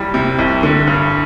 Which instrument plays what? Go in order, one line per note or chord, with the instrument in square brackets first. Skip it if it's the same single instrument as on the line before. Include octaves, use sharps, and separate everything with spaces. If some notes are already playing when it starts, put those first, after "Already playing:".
Already playing: [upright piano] C2 G3 E4
C3
C2
D3
G2